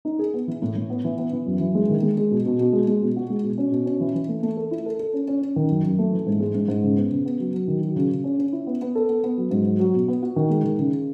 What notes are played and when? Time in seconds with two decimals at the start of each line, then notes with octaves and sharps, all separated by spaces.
0.05 D#4
0.19 G#4
0.34 B3
0.48 E3
0.62 A2
0.76 A2
0.90 B3
1.04 E3
1.18 B3
1.33 E3
1.46 F#2
1.60 E3
1.75 G#3
1.89 D#3
2.03 G#3
2.17 G#3
2.31 B2
2.46 B2
2.60 B2
2.73 G#3
2.87 G#3
3.02 B2
3.16 F#4
3.30 G#3
3.44 B2
3.58 C#4
3.72 B2
3.86 C#4
4.00 E3
4.15 E3
4.29 A3
4.43 A3
4.57 A4
4.71 E4
4.86 A4
4.99 A4
5.13 C#4
5.28 C#4
5.41 C#4
5.56 D#3
5.70 F#2
5.85 F#2
5.99 A3
6.13 E3
6.26 G#2
6.40 G#3
6.55 G#2
6.68 G#2
6.83 C#3
6.97 B3
7.11 C#3
7.26 B3
7.40 F#3
7.54 F#3
7.68 D#3
7.81 F#3
7.96 C#3
8.11 C#3
8.24 C#4
8.39 C#4
8.53 E4
8.67 B3
8.82 B3
8.95 A4
9.10 B3
9.24 B3
9.37 F#3
9.51 G#2
9.65 F#3
9.80 F#3
9.94 B2
10.08 B3
10.22 F#4
10.36 D#3
10.50 G#3
10.64 D#3
10.78 C#3